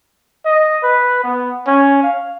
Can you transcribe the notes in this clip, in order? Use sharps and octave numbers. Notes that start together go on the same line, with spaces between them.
D#5
B4
B3
C#4
F5